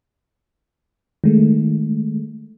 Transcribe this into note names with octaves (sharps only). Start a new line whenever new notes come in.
D#3 G#3 A3